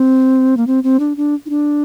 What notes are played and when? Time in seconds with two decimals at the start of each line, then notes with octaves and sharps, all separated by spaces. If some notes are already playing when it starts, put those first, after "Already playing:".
Already playing: C4
0.57 A#3
0.67 C4
0.84 C4
1.00 D4
1.17 D4
1.46 D#4
1.50 D4